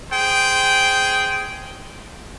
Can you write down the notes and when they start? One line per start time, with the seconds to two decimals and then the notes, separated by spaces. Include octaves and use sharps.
0.11 G#4 C5 G5